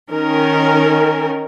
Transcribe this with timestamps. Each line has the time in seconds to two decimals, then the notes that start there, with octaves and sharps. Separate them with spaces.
0.11 D#3 C#4 A#4